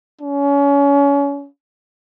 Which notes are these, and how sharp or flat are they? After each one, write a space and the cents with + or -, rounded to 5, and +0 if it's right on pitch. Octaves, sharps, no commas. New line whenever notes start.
C#4 +30